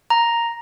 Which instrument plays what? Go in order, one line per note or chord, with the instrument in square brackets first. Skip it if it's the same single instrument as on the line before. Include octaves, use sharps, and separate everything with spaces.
[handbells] A#5